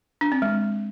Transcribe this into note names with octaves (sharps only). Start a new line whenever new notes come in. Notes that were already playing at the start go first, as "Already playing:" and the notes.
D4
C4
G#3